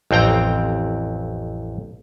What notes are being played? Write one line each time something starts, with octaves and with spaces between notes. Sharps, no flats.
A1 F2 C4 G5 A#5